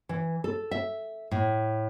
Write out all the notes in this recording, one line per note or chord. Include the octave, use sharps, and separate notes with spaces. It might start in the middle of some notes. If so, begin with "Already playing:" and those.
E3
A4
E5
A2